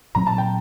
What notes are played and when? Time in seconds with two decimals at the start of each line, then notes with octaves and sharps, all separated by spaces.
0.15 A#2 F#3 C4 A#5
0.27 A5
0.38 G5